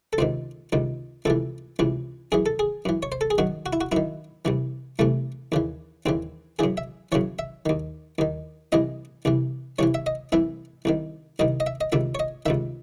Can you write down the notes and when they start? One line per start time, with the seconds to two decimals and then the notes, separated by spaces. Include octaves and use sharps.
0.13 A4
0.18 C#2 C3 D#3 C5
0.72 C#2 C3 D#3
1.25 C#2 C3 E3 A4
1.79 C#2 C3 E3
2.32 F#2 E3 G#4
2.46 A4
2.59 G#4
2.85 F#2 E3
3.03 C#5
3.12 C5
3.21 A4
3.31 G#4
3.38 F#2 D#3 F#4
3.66 F#4
3.73 E4
3.81 F#4
3.92 F#2 D#3 E4
4.45 C2 C3 E3
4.99 C2 C3 E3 A3
5.52 D#2 C#3 E3
6.06 D#2 C#3 E3 C4
6.59 F#2 C#3 E3 G#4
6.77 E5
7.12 F#2 C#3 E3 C#5
7.39 E5
7.66 D#2 D#3
8.19 D#2 D#3
8.72 C2 C3 E3 D#5
9.25 C2 C3 E3
9.79 C2 C3 E3 C#5
9.94 E5
10.06 D#5
10.32 C2 C3 E3 E5
10.85 C2 C3 D#3
11.39 C2 C3 D#3 D#5
11.60 D#5
11.67 E5
11.81 D#5
11.92 C#2 C3 D#3 E5
12.15 C#5
12.20 D#5
12.46 C#2 C3 D#3 E5